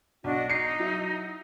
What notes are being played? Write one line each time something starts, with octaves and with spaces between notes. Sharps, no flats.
B1 D4 F#4 D#5
D#4 C7 C#7
F#3 E4